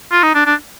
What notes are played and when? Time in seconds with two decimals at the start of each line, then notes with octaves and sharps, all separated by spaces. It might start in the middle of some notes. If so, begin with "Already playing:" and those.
0.12 F4
0.23 D#4
0.35 D4
0.46 D4